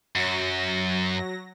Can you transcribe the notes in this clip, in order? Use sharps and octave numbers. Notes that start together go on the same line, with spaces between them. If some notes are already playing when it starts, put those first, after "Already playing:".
F#2 F#3 A#6